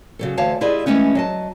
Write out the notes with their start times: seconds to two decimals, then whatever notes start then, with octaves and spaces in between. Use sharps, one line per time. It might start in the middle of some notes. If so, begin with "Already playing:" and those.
0.19 C#3 F#3 A4
0.37 D2 E3 C#5 F5 A5
0.61 E4 F4 G4 G#4 D5 D#5
0.86 E3 F#3 G#3 A3 C#4 E4
1.15 F#3 D#5 A5